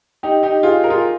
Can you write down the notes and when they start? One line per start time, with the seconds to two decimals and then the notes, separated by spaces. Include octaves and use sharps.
0.23 D#4 G4
0.43 D#4 G4
0.63 F4 G#4
0.84 A#4
0.90 F4 G#4